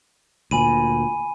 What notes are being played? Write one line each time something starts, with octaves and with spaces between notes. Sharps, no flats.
D2 A#2 G#5 B5 D#7